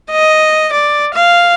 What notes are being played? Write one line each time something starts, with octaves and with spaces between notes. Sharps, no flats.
D#5
D5
F5